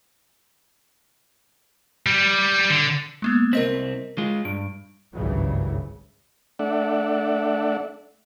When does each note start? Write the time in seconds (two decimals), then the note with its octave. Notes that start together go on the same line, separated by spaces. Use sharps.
2.06 G3
2.70 D3
3.22 G#3 A#3 B3
3.53 C2 C4 A#4 D#5 B6
4.18 G#3 F4
4.45 G2 D7
5.14 G#1 C#2 G2 C#3 E3 F#3
6.59 A3 D4 D5 E5 F#5